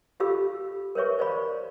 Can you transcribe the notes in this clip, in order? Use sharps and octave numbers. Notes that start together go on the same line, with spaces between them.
F4 G4 A4 F5 B5 E6
A#4 B4 C#5 E5 C#6
C5 D5 F5 B5